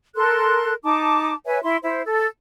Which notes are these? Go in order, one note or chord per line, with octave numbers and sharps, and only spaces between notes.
A4 A#4 C6 F#6
D#4 A5 D6
B4 C#5 E5 G#5
E4 C6
E4 C5
A4